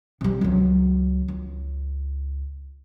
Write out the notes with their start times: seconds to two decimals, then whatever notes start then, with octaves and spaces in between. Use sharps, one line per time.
0.21 C3 G3
0.41 C#2 F#3
1.28 C#2